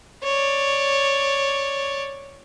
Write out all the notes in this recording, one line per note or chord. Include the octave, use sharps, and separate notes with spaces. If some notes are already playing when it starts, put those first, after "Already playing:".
C#5 D5